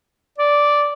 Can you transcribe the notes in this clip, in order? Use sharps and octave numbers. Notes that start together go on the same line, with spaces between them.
D5